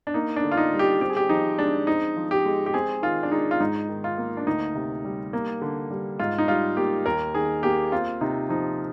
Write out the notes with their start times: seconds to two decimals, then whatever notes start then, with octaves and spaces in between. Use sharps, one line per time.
0.07 D4
0.14 A#3 D#4
0.36 D4
0.44 D3
0.52 F4
0.57 D#4
0.73 G3
0.79 G4
1.01 C4 G4
1.10 G#4
1.17 G4
1.29 F3 D#4
1.59 G#3 D4
1.87 C4 D#4
2.16 F3
2.31 G4
2.46 G#3
2.66 G4
2.74 C4 G#4
3.02 D#3 F4
3.23 D4
3.32 G#3 D#4
3.51 F4
3.60 G#2 D#4
3.89 D#3
4.04 F4
4.18 A#3
4.37 D4
4.47 D2 D#4
4.75 C3
5.04 G3
5.33 A#3
5.62 D3
5.90 G3
6.19 G#2 F4
6.38 D#4
6.48 G3 F4
6.77 A#3 G4
7.06 D#2 A#4
7.35 D#3 G#4
7.63 A#3 G4
7.92 C4 F4
8.21 C3 D#4
8.49 F3 D#4